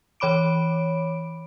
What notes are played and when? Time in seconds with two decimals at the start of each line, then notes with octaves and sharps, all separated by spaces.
0.20 E3 C#5 B5 D6 D7